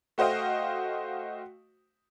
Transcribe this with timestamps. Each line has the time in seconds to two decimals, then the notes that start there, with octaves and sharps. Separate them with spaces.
0.18 A3 F#4 C5 D#5 F5 G5